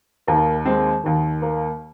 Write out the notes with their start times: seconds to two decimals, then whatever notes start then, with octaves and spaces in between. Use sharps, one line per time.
0.27 D#2 D#3 A#3
0.66 G#3 C4
1.04 D#2 D#3
1.42 A#3